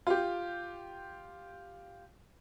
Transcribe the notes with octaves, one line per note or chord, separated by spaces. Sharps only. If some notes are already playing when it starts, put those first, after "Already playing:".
F4 G4